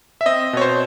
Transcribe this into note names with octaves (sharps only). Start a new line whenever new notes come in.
E5
C4 D#5
B2 C#5
C5